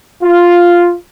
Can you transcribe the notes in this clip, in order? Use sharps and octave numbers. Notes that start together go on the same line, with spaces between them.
F4